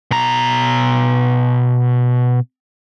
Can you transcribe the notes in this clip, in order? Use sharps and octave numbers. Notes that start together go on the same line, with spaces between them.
B2 A#5